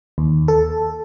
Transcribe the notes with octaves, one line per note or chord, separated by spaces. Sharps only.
D#2
A4